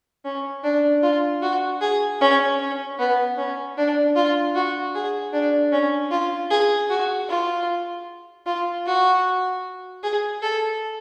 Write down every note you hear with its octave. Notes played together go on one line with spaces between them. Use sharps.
C#4
D4
F4
F#4
G#4
C#4
C#4
B3
C#4
D4
F4
F#4
G#4
D4
C#4
F4
G#4
F#4
F4
F4
F#4
G#4
A4